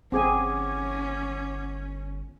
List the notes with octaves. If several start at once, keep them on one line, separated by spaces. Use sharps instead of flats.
G1 C4 C#4 G#4 F#5 G#5 D6 G#6